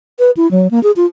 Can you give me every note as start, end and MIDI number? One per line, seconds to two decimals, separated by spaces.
0.19 0.31 71
0.37 0.49 64
0.51 0.70 54
0.71 0.82 58
0.83 0.91 68
0.96 1.06 65